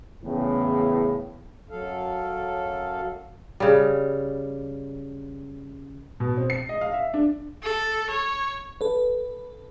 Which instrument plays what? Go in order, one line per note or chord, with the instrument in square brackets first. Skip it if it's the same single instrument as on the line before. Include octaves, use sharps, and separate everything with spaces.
[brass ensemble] E2 A2 C#3
[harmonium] F#2 F#3 A4 F5
[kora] C#3 G3
[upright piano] B2
C4
C7
D#5
F5
E5
D4
[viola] A4
C#5
[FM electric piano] A4 B4